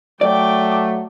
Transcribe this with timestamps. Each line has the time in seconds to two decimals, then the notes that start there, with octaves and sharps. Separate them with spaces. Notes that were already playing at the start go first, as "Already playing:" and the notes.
0.21 F#3 A3 D5 G5 D6